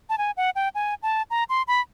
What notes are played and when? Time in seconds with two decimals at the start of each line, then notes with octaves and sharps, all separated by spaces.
0.09 A5
0.18 G#5
0.37 F#5
0.56 G5
0.75 G#5
1.03 A5
1.31 A#5
1.49 C6
1.68 B5